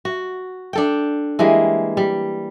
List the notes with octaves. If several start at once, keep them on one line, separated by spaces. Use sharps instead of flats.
F#4
D4 A4 G5
E3 G3 G#3 A#3
G3